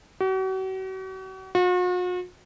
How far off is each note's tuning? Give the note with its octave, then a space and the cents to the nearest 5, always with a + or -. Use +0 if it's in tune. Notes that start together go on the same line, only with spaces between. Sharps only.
F#4 +40
F#4 -45